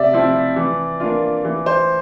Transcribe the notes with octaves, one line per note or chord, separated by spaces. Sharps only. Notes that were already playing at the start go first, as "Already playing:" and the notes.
Already playing: C3 D5 E5
F3 C4 E4
E3
A#3 D4 F4
E3
C5